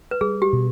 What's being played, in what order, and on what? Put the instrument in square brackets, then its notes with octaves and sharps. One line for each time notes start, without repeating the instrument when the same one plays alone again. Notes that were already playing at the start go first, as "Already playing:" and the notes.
[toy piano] B4
[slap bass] G3 [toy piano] G#4
[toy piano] G4
[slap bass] B2